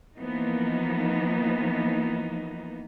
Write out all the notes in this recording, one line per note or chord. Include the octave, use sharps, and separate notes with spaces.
E3 F3 A#3 B3 D#4